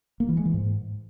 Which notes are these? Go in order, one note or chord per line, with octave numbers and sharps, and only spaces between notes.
A#3
E3
G#3
E3
G#2